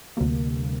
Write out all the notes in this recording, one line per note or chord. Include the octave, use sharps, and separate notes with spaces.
D2 C3 G3 A#3